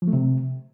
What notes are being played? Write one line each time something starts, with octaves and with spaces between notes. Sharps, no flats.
F3
A3
C3